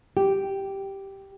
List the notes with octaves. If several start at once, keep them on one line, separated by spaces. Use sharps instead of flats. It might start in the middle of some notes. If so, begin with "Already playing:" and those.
G4